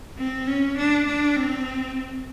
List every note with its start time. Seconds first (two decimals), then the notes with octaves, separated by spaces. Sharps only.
0.18 C4
0.47 C#4
0.77 D4
1.07 D4
1.36 C4